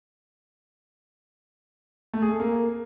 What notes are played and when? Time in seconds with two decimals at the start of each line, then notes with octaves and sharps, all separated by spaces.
2.13 A3
2.22 G#4
2.31 A4
2.40 A#3